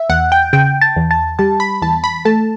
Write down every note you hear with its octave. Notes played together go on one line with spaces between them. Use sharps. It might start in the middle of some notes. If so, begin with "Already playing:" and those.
Already playing: E5
E2 F#5
G5
C#3 G5
A5
E2
A5
G3 A5
B5
E2 A5
B5
A3 A5